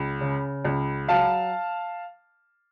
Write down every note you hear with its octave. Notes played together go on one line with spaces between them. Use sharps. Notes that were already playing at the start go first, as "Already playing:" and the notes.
Already playing: C#2
C#3
C#2
F#3 F5 A5